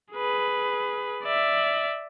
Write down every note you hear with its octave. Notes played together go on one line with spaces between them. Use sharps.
G#4 B4
D5 E5